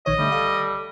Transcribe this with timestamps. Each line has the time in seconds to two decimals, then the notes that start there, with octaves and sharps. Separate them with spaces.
0.06 A#1 D#3 C#5 D#5
0.19 D3 G3 A3
0.32 A4 F5